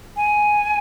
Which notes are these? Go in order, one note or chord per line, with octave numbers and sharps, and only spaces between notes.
G#5